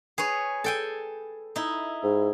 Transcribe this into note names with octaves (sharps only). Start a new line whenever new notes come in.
G#4 B4 C#5
A4 G5 G#5
D#4 E4
G#2